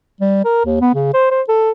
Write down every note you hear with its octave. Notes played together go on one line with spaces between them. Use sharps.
G3
A#4
D#2
B3
C#3
C5
C5
A4